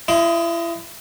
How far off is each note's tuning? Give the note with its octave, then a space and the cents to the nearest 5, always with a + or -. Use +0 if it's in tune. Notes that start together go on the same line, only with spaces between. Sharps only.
E4 +35 D#5 +15 C6 -15